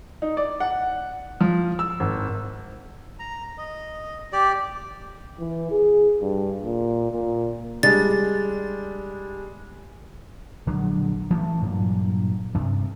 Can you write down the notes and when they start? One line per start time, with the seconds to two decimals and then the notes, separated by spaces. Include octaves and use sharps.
0.22 D#4
0.37 D5
0.60 F#5
1.41 F3
1.79 E6
2.00 G#1
3.19 A#5
3.58 D#5
4.32 G4 D5
5.39 E3
5.71 G#4
6.22 G2
6.62 A#2
7.12 A#2
7.83 G3 G#3 D4 A6
10.67 A#1 D3 F#3 G#3
11.30 E3 A3 C#4
11.62 G2 A#2 F#3
12.54 G2 C3